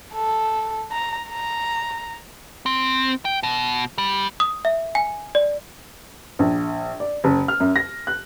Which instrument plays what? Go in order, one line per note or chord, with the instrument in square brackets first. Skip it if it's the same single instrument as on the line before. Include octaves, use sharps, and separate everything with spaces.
[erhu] A4
A#5
A#5
[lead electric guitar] C4
G5
B2
G3
[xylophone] D#6
E5
G#5
D5
[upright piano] A#1
D5
F#1
F6
F#2
A#6
F#6